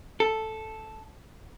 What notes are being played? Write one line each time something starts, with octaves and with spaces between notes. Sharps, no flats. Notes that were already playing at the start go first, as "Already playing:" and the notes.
A4